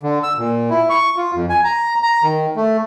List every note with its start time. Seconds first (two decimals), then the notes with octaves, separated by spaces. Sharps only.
0.03 D3
0.23 E6
0.38 A#2
0.70 E4
0.90 C#6
1.17 F4
1.35 F2
1.50 G#5
1.64 A#5
2.03 A#5
2.24 D#3
2.56 A3